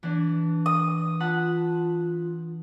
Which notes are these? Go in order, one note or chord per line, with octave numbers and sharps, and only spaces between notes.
E3 D4
D#6
F4 F#5 A5 B5